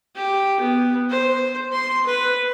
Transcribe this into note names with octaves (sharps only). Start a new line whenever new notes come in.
G4
B3
C5
C6
B4